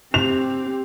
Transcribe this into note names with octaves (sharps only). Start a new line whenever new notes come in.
C4 G4 F7